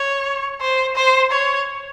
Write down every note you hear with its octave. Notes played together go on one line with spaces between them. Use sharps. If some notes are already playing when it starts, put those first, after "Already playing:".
Already playing: C#5
C5
C5
C#5